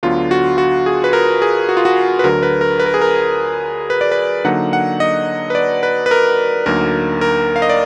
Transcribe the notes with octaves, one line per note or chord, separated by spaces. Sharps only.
D2 D3 F#3 B3 F4
F#4
F#4
G#4
B4
A#4
G#4
F#4
F4
F#4
B4
D2 D3 F#3 A#4
B4
A#4
B4
A#4
G#4
A#4
B4
D5
B4
D3 F#3 A#3 D#4 F#5
F#5
D#5
B4
D5
B4
B4
A#4
D2 D3 F#3 A#3 D#4 A#4
A#4
F5
D#5
D5